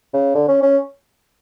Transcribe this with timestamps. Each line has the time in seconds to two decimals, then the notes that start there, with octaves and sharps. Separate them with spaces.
0.14 C#3
0.35 D3
0.48 C#4
0.63 C#4